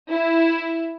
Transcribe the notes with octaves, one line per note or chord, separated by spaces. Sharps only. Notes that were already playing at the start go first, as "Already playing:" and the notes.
E4